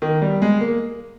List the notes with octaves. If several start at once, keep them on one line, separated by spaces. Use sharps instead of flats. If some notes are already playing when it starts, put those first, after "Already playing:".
D#3
G3
G#3
A#3